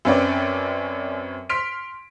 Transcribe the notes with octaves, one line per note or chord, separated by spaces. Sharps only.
F#2 C4 C#4 B4 D5 G5
C6 F6 B6 D7